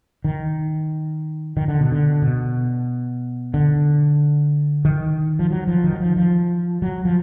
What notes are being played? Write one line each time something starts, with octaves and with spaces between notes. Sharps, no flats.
D#3
D#3
D3
B2
D3
B2
D3
D#3
F3
F#3
F3
D#3
F#3
F3
F3
F#3
F3